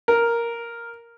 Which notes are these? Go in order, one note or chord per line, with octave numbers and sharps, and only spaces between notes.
A#4